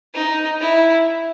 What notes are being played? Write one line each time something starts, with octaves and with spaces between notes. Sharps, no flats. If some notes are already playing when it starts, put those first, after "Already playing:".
D#4
E4